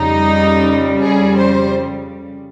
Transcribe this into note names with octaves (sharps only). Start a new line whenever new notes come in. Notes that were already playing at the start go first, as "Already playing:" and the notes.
Already playing: F2 C#3 G3 D#4
G#4
C5